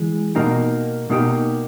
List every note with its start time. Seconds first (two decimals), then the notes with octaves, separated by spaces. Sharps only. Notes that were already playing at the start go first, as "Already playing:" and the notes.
Already playing: E3 G#3
0.35 B2 A#3 D#4 G4
1.10 B2 A#3 D#4 G4